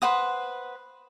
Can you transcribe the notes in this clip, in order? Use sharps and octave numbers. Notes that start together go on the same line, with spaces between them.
B4 C5 F#5 D#6